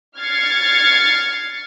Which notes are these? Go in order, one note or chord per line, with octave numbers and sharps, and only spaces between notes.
F6 G#6 A6 C7 C#7